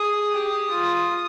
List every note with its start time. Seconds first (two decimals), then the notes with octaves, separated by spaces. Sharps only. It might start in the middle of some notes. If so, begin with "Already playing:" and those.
Already playing: G#4 D#6
0.30 G4
0.70 F4